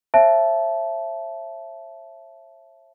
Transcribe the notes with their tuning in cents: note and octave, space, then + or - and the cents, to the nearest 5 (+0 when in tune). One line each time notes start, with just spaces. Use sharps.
C#5 -45 E5 +20 A5 -15